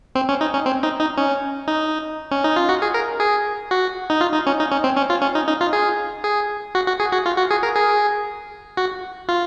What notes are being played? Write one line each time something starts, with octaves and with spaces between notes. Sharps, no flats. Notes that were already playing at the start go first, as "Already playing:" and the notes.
C4
C#4
D#4
C#4
C4
D#4
D#4
C#4
D#4
C#4
D#4
F4
F#4
G#4
A#4
G#4
F#4
D#4
F4
D#4
C#4
D#4
C#4
C4
C#4
F4
C#4
D#4
D#4
F4
G#4
G#4
F#4
F#4
G#4
F#4
F4
F#4
G#4
A#4
G#4
F#4
F4